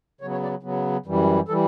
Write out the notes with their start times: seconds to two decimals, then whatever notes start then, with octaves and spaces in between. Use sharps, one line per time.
0.21 C#3 F#3 B3 C#5
0.31 C#5
0.43 D5
0.63 C#3 F#3 B3
1.06 F#2 E3 G3
1.48 E3 G3 A4